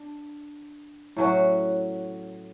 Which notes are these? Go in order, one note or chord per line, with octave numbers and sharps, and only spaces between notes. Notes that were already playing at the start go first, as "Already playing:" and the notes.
Already playing: D4
A2 F#3 C#4 F#4